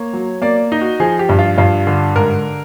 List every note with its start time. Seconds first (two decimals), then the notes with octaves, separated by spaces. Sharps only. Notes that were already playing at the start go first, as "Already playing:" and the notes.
Already playing: A#3 C#5
0.13 F#3
0.42 A#3 D5
0.72 D#4
0.81 F#4
1.00 F3 G#4
1.19 G4
1.29 G2
1.39 F4
1.58 G2 F4
1.87 D3
2.16 G#2 A#4